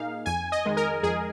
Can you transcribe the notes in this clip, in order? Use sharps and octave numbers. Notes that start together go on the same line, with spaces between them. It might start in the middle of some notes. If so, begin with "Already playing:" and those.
Already playing: A#2 A#3 D#4 G#4 F5
F2 G#5
D#5
D#3 G#3
A#4
F2 G#4